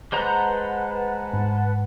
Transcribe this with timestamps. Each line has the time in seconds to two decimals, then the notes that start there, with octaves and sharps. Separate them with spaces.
0.12 G#3 B4 C5 F#5 A5 A#5
1.34 G#2